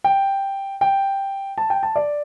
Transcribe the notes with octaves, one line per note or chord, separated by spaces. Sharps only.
G5
G5
A5
G5
A5
D5